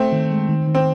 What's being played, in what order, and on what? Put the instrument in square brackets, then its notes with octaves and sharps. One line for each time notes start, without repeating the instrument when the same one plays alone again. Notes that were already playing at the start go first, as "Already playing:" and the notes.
Already playing: [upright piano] A3 C4
[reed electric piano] D#3
G#3
D#3
D#3
[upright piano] C4